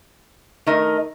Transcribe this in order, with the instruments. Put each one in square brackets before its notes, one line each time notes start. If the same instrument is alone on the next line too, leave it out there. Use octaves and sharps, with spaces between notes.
[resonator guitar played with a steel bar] D#3 A3 D#4 A#4 D#5